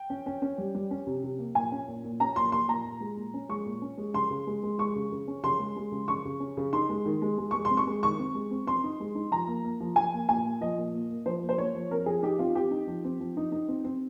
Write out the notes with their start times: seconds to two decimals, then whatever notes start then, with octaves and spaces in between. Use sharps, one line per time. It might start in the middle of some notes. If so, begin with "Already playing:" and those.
Already playing: G5
0.10 C#4
0.26 C#4
0.42 C#4
0.58 G3
0.75 G3
0.91 C#4
1.07 C3
1.24 C3
1.39 A#3
1.55 A#2 G#5
1.72 C#4
1.87 A#2
2.04 A#2
2.20 C#4 A#5
2.36 A#2 C6
2.52 A#2 C6
2.68 A#2 A#5
2.85 A#2
3.00 G#3
3.17 A#2
3.34 C#4
3.49 G#3 C#6
3.66 A#2
3.82 C#4
3.97 G#3
4.14 C#3 C6
4.30 C#3
4.47 G#3
4.63 G#3
4.78 G#3 C#6
4.96 C#3
5.12 C#3
5.28 C#4
5.44 C#3 C6
5.59 G#3
5.76 G#3
5.92 C#3
6.08 C#3 C#6
6.25 C#3
6.40 C#4
6.57 C#3
6.73 D#4 C6
6.89 G#3
7.06 D#3
7.22 G#3
7.38 G#3
7.51 G#3 C#6
7.65 C6
7.70 C4
7.77 C#6
7.87 G#3
8.03 D#3 C#6
8.19 C4
8.34 G#3
8.51 C4
8.67 C4 C6
8.84 D#4
9.00 G#3
9.15 D#4
9.31 F3 A#5
9.47 A#3
9.65 A#3
9.81 F3
9.96 F3 G#5
10.13 A#3
10.29 A#2 G#5
10.45 A#3
10.61 F3 D#5
10.78 A#2
10.94 A#3
11.10 A#3
11.26 F3 C5
11.42 A#3
11.49 C5
11.58 A#3 C#5
11.75 F3
11.91 C4 A#4
12.06 F3 G#4
12.23 D#4 G4
12.39 C4 F4
12.55 C4 G4
12.71 D#4
12.87 F3
13.04 C4
13.20 F3
13.37 D#4
13.52 D#4
13.68 C4
13.84 C4